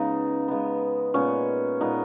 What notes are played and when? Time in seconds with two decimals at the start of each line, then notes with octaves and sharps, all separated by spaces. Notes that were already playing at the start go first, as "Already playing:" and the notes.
Already playing: C#3 G#3 B3 D#4
0.48 C#3 G#3 B3
1.14 A#2 G#3 B3 C#4
1.80 A#2 G#3 B3 D#4